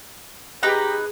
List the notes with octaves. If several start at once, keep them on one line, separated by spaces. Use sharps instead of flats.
D#4 G4 G#4 B4 A#5